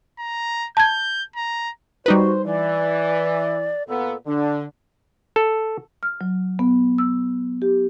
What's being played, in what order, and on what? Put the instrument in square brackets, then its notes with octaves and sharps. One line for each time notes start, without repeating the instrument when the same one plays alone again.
[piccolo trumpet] A#5
[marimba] A5 G#6 [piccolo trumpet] G6
[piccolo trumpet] A#5
[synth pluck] G3 D#4 B4 [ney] F#4 [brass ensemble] C5
[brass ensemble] E3 [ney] D5
[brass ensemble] A#2 A#3 B3 [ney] A4
[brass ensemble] D3 [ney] D4
[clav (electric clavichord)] A4
[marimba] F6
F#3
B3
E6
G4